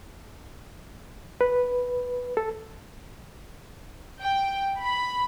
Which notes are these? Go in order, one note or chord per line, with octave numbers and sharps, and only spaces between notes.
B4
A4
G5
B5